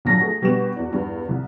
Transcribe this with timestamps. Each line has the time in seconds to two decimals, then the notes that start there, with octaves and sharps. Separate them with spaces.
0.05 A#1 D3 F#3 A5 A#6
0.20 A3 G#4
0.42 B2 G3 B3 D4 E7
0.76 E2 F#4 D5
0.90 E2 G2
1.29 C2